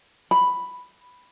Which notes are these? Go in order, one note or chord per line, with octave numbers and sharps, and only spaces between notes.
B5